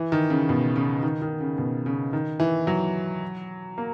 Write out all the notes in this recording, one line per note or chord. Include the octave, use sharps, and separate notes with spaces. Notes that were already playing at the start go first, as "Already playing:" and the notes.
Already playing: E3
D#3
C#3
B2
C#3
D#3
D#3
C#3
B2
C#3
D#3
E3
F#3
A#3